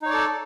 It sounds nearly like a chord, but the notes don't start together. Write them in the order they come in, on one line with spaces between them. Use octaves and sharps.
D#4 C#5 D5 A4